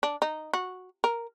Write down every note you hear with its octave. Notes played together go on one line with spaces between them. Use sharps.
D4
D#4
F#4
A#4